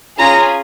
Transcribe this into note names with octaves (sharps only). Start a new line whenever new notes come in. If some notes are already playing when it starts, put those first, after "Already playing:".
C#4 F4 G#4 A#5